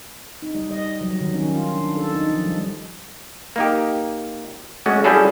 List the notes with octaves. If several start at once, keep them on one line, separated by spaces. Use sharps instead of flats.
D#4
G3
D#5
F#3
D#3
C#4
F4
D4
A4
D#4
F3
G3
A#3 D#4 G4
G#3 A3 C#4 F#4
G3 C#4 E4 F#4 G#4 A4